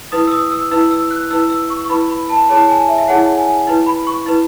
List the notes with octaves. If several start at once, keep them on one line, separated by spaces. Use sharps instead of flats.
E4 B4 D#6
E6
D#6
E6
E4 B4 E6
E6
F#6
E4 B4 E6
E6
C#6
C#6
E4 B4 B5
B5
A5
E4 G#4 C#5 A5
G#5
E5
E5
E4 G#4 C#5 F#5
G#5
E4 B4
B5
C#6
E4 B4